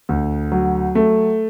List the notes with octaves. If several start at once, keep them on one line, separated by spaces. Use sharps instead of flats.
D2
F#3
A3